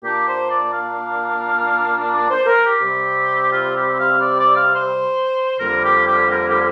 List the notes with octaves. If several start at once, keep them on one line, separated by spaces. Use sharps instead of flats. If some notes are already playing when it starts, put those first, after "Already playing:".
A#2 A#3 D4 G4
C5
D5
F5
D5
C5
A#4
G4
C3 G3 C4
F4
G4
F5
D5
D5
F5
C5
F2 D3 G3 A#3 A#4
G4
G4
A#4
G4